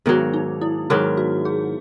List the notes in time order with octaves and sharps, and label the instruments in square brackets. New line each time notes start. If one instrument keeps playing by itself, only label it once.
[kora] G#2 D#3 F#3 [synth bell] B3
[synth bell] D#4
E4
[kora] G#2 D#3 F#3 [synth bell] F#4
[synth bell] F#4
G#4